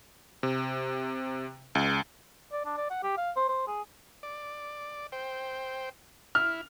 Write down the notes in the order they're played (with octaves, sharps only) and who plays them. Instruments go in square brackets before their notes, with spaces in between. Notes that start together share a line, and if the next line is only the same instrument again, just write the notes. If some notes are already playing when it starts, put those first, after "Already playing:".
[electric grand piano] C3
C#2
[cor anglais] D5
D4
D5
F#5
G4
F5
C5
C5
G#4
[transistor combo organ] D5
C5 G5
[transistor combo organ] E4 [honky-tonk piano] F6